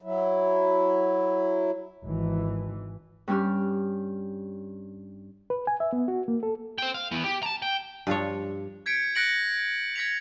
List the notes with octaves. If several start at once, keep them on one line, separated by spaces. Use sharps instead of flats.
F#3 E4
G#1 E3
G2 G3 C#4 G4 F6
B4
G#5
E5
B3
F#4
A#3
A4
C5 G5
F5
E3 B3
G4
A5 A#5
G5
G2 F3 D4 C#5
G6 G#6 B6 C#7 D7
F#6 A6 A#6 C#7 D7 F#7
G#6 A#6 B6 C#7 F7